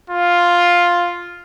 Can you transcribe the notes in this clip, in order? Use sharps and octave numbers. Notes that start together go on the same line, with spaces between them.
F4